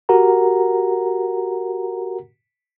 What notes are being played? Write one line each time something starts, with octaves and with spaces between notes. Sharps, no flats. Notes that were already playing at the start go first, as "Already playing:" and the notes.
F#4 G4 A#4 F#5 A#5